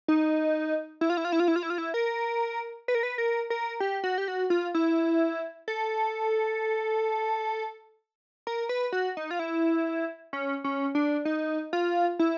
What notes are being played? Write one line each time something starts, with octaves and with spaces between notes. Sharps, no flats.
D#4
E4
F4
E4
F4
E4
F4
E4
F4
E4
F4
E4
A#4
B4
A#4
B4
A#4
A#4
G4
F#4
G4
F#4
F4
E4
A4
A#4
B4
F#4
D#4
F4
E4
C#4
C#4
D4
D#4
F4
E4